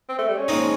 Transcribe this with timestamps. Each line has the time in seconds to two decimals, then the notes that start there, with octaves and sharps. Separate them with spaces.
0.09 C4
0.18 A3
0.28 G3
0.38 C#4
0.48 A#2 F3 G#3 C4 D#4